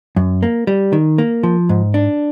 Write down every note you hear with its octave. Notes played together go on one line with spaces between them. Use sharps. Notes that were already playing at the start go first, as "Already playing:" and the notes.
F#2
A#3
G3
D#3
A#3
F3
G#2
D4